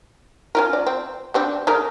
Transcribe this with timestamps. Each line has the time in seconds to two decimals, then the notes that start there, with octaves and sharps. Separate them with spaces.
0.55 C#4 F4 A#4
0.73 D5
0.86 C4
1.34 G3 C4 D4
1.67 C#3 A3 A#4